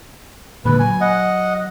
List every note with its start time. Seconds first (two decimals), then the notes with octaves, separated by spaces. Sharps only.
0.65 A#2 D3 G#3 B4
0.80 F#3 G#5
1.01 D#5 F#5